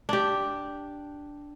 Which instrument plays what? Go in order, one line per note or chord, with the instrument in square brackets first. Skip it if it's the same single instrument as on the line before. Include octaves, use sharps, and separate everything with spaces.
[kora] D4 G4